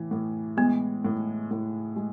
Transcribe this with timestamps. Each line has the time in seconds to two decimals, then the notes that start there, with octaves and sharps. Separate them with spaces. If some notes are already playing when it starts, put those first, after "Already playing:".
Already playing: A2 E3
0.11 A2
0.57 G#3 B3
1.05 A2
1.51 A2
1.96 G#3